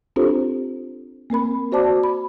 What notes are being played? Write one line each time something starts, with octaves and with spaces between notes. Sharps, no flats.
C4 D4 F4 G4 A4 C5
A#3 C4 A#4 B5
F#4 C5 D5 A5 D6
B5